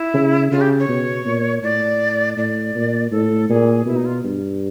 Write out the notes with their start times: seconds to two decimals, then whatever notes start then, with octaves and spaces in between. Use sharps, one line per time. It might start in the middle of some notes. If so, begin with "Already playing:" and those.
Already playing: E4
0.15 C#3
0.51 C#3 F4
0.61 G4
0.79 C#5
0.89 B2
1.26 A#2
1.63 A2 D5
2.37 A2 D5
2.75 A#2
3.12 A2 A4
3.49 A#2 G#4
3.86 B2 E4
3.96 D#4
4.05 F4
4.24 G2